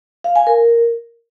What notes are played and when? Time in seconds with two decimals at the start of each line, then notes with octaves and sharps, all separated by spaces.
0.24 F5
0.36 G#5
0.47 A#4